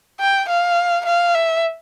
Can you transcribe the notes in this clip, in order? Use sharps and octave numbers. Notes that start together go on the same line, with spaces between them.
G5
F5
F5
E5